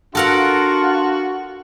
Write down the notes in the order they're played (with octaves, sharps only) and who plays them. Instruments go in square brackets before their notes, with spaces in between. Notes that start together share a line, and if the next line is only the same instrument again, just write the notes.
[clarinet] D4 [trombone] F4 [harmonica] F#4 [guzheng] A4 A#4 F#5